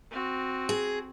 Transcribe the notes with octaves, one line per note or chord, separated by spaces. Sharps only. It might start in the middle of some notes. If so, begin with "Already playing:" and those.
C4 F#4
G#4